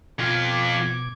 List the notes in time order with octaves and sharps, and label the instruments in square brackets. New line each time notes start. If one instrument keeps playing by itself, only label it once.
[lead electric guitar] F2 F4 [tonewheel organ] B2 D6 G#6